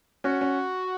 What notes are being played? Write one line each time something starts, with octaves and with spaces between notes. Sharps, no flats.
C#4 F#4
C#4